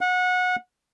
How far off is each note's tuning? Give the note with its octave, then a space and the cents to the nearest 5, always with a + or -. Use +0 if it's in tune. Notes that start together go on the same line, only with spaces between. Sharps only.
F#5 -25